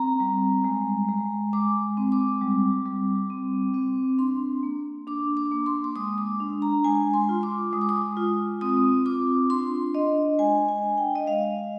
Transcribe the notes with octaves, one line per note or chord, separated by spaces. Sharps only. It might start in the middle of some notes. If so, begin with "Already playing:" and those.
Already playing: C4 A#5
G3
G#3
G#3
G#3 D6
C4
D6
G3
G3
C4
C4
D4 C6
A#3
D4 D6
D6
A#3
C6
D6
G#3 D#6
D6
D4
A#5
G#3 G#5
C6
F4
D6
G#3 D#6
D6
D#6
F4
C4 D#6
F4 D6
D4 C6
D4 D#5
G#3 G#5
G#5
D4
G5
D#5
G#3 F5